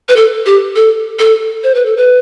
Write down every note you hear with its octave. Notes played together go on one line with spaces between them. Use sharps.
B4
A4
G4
A4
A4
C5
B4
A4
B4